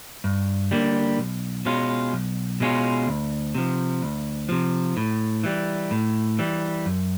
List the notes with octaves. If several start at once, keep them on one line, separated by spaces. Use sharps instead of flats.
G2
D3 G3 A#3
B1
B2 G#3 C#4 F4
B1
B2 G#3 C#4 F4
D2
C3 F3
D2
C3 F3
A2
E3 G3
A2
E3 G3
F#2